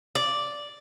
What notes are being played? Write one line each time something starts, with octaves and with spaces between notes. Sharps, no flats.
D5